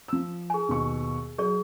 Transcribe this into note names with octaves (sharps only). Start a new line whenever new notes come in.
F3 E6
G#4 G#5
D#2 B2 C#6
F#3 G#4 D5